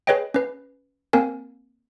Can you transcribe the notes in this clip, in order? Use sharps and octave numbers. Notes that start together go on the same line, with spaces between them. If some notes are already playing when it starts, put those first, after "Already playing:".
G#4 B4 C#5 D#5 G5
C#4 B4
A#3 C4 A#4 G#5